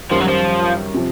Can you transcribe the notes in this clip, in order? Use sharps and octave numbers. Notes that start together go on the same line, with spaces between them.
F#2 D#3 F3 G3
F#3
F3
C3 F3